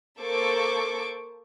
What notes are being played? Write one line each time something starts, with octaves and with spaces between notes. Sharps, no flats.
A#3 A4 C5 C#6 D6